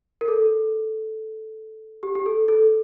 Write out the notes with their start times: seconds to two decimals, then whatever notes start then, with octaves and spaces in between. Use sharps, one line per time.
0.21 A#4
0.28 A4
2.03 G4
2.15 G4
2.26 A4
2.48 A4